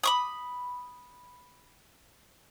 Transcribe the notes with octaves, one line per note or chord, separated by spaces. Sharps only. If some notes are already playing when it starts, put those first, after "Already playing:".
B5 C#6 D#6